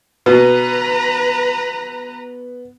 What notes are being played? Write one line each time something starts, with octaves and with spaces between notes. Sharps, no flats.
B2 B3 B4 A#5